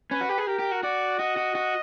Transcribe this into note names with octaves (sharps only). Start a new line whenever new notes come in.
C#4 B4
F#4
G4
G#4
G4 A#4
G4
F#4
F#4 D5
F#4 D#5
F#4
F#4